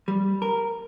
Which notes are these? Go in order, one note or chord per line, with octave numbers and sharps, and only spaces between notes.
G3
A#4